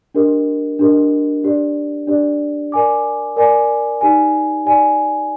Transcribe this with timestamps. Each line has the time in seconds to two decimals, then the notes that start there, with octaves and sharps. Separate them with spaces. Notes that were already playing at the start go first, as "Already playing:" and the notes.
0.15 D4 G4 A#4 D#5
0.79 D4 G4 A#4 D#5
1.44 D4 G4 D5
2.07 D4 G4 D5
2.72 A#4 D5 G#5 D6
3.36 A#4 D5 G#5 D6
4.01 D#4 G4 D5 G#5
4.65 D#4 G4 D5 G#5